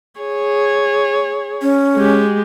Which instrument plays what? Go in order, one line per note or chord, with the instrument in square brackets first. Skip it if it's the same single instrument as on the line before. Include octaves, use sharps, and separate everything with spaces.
[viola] G#4 C#5
[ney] C#4
[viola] G#3 G4